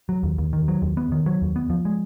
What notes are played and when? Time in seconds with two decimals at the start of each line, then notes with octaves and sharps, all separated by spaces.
0.09 F#3
0.23 D#2
0.38 D#2
0.53 D#3
0.68 F#3
0.82 D#2
0.97 B3
1.12 D#3
1.26 F#3
1.42 D#2
1.56 B3
1.70 F3
1.85 G#3